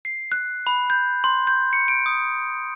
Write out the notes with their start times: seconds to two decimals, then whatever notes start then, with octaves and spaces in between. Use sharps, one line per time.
0.05 C7
0.32 F#6
0.67 B5
0.90 G6
1.24 C6
1.47 G6
1.73 C#7
1.88 D7
2.06 D#6